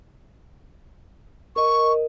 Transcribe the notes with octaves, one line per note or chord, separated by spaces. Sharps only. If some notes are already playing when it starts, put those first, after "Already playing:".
A#4 D#5 C#6